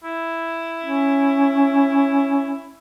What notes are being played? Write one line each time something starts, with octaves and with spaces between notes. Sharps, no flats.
E4
C#4